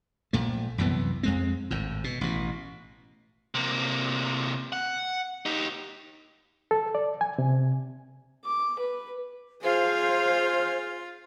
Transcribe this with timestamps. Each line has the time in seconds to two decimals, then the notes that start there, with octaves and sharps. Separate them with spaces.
0.33 A#1 A#2 A3
0.78 C2 F#2 E3 B3
1.23 F2 G#3 C4
1.71 G#1 A2
2.04 B2
2.21 A1 B2
3.55 C3 A#3
4.72 F#5
5.46 D#4 G4
6.71 A4
6.95 D5
7.21 G#5
7.38 C3
8.45 D6
8.79 B4
9.63 F4 G#4 C5 F5